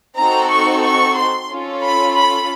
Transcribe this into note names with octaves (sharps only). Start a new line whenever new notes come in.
C4 D#4 F#4 A4 A#5
C#6
C#6
C6
C#4 F4 A4
B5
B5